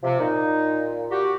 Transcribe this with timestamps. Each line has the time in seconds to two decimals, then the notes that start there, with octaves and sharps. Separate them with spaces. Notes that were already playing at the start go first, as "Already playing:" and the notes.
0.03 C3 F3
0.20 A#2 D#4
1.11 F#4 G4